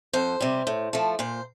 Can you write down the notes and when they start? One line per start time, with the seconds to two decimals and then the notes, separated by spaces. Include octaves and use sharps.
0.13 F2 C5
0.41 C3 G3
0.67 A2
0.93 F3 A3
1.19 A#2 C5